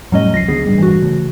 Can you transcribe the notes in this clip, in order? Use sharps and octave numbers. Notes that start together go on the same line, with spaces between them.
F2 A2 F#3 G3 C#4 D#5
C#2 F3 A#6 C7
C#2 D3 B3 G#4
A1 G2 G3
E3 F#4
C#3 A3